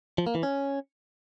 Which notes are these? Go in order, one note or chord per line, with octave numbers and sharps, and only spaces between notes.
F3
A#3
E3
C#4